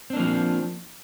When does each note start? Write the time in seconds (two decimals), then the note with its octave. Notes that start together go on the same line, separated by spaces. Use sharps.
0.10 C4
0.13 D4
0.16 A#3
0.19 F3